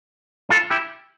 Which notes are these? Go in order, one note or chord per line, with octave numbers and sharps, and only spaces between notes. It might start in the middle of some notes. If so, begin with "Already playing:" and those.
F4 A4
E4 G4